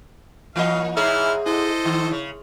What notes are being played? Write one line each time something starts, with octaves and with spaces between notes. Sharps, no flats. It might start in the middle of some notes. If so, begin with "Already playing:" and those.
E3 A#3 D#5 F5
G#2 E3 E4 G#4 C#5 E5 A#5 F6
E4 A4 C5 D#5
D#3
C#3